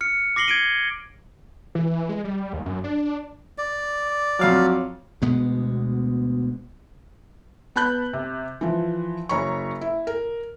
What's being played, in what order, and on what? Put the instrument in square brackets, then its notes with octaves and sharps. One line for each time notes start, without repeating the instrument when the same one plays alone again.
[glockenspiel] F6 C#7
D6 A#6 C7 F#7 G7
G#6 D7 D#7
[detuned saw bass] E3
G#3
G3
D#2
F#2
D4
[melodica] D5
[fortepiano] F2 F5 D6 [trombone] F#3
[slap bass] D2 B2 G#3 B3
[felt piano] B3 A5 B5 F#6 G6
C3
E3 F3
F#1 C#5 A#5 B5 C#6
E4
A#4